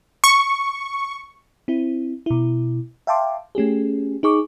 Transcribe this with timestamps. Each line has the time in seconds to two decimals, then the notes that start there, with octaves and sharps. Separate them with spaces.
0.24 C#6
1.68 C4 E4
2.26 B2 E4
3.07 E5 F5 G5 A5 C6 D6
3.55 A3 C#4 G4 G#4
4.23 D#4 G#4 C#6 D6